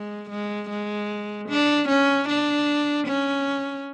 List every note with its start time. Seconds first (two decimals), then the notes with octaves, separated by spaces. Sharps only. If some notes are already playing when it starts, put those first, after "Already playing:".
Already playing: G#3
0.30 G#3
0.69 G#3
1.49 D4
1.88 C#4
2.28 D4
3.07 C#4